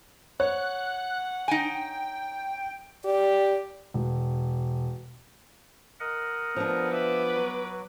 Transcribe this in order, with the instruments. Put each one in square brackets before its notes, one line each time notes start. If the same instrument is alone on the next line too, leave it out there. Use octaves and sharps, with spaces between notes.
[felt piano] C#5 [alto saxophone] F#5 [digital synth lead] F#6
[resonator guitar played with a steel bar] D#4 G#5 [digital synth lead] G5
[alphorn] G4 [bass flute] D5
[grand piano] E1
[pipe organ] A#4 D#5 F#5
[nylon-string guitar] F3 D4 [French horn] B3
[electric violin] B4 D6 [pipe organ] E5
[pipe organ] F#3